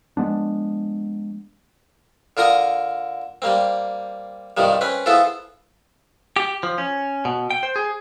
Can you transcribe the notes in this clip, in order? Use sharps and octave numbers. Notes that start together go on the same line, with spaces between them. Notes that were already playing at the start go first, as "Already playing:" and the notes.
F3 G#3 B3 D4
D3 F4 A#4 G#5 D#6
G3 A#3 C4
G2 C3 D#3 F3 G3
C4 C#4 B4
F3 B3 E4 F4 G#4 A4
G4
F3
C#4
B2
G5
C5
G#4